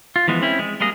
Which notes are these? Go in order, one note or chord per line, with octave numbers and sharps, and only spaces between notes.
F4
E3 F3 G#3 B3
C4 C#4 E4
G#3
G3 G#3 A#3 G#4 D#5